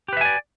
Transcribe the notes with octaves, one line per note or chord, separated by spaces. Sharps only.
G4 B4 D5 E5 G#5